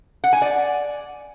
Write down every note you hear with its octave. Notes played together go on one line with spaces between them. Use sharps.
F#5
G#5
D5